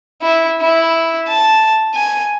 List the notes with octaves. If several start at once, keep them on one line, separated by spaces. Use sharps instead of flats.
E4
E4
A5
G#5